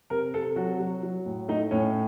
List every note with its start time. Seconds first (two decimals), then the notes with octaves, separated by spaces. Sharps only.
0.10 C3 A#4
0.34 C3 A4
0.56 F#3 F#4
0.79 F#3
1.03 F#3
1.26 A2
1.48 A3 D#4
1.71 A2 C#4